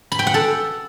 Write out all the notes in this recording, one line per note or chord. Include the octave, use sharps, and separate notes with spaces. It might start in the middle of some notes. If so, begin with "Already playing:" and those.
B5
G5
F#5
A4